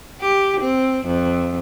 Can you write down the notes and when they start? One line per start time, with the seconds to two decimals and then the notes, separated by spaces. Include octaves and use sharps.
0.21 G4
0.61 C4
1.06 F2